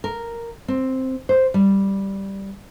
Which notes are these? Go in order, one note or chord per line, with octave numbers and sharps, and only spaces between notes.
A#4
C4
C5
G3